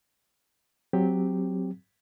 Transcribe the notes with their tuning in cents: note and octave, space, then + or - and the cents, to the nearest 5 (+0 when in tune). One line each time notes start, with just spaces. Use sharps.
F#3 +5 C4 -5 G4 +10